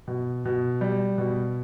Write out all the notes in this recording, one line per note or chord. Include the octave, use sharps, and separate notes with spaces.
B2
B2
G3
B2